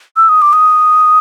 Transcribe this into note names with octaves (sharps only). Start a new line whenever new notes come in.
E6
D#6
D6
D#6